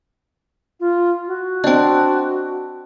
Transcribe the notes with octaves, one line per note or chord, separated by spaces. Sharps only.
F4
F#4
C4 D4 D#5 A5